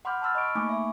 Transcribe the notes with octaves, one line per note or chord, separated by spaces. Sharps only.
F#5 B5 C6 D6 F6 G6
A5 B5 C6 E6 F6 A6
D#5 B5 C#6 D7
A3 A#3 D#4 G#5 C#6 D6
E5 B5